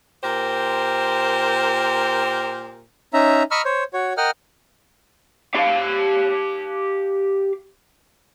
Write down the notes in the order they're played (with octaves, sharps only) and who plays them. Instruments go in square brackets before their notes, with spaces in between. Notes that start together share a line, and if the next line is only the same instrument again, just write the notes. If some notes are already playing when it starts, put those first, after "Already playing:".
[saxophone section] A#2 G4 A#4 C5
[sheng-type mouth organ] C#4 D#4 E5 A#5
D#5 A#5 B5 C#6 E6 F6
C5 C#5
F#4 C#5
A#4 D#5 F#5 G5 F6
[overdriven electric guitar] G4 F5